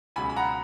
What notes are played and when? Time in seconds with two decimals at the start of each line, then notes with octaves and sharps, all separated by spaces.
0.16 C#2 B2 F#3 G#5 B5
0.30 B5
0.36 F#5 A#5